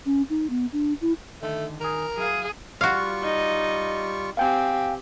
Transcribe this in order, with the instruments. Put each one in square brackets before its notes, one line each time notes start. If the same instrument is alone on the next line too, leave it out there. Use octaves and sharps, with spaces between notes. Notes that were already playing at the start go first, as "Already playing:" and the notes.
[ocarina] C#4
D#4
B3
D4
E4
[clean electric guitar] D3 D#3 [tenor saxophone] A3
[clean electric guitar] D#3 G#4 [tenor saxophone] A#4
[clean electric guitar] F#3 E4 F5 [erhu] G#4
[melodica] G3 F4 C#6 [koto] F#4 F5
[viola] D#4 D#5
[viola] C4 G4 [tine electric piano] F5 G5 G#5